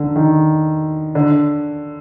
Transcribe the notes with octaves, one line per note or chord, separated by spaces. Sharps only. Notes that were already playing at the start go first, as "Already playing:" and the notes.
Already playing: D3
D#3
D3